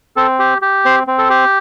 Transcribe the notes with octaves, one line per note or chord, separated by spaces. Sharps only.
C4 A4
G4
G4
C4 C5
C4
A4
G4